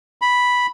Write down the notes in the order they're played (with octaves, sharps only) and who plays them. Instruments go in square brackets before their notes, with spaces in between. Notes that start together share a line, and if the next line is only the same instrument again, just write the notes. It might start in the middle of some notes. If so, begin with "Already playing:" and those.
[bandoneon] B5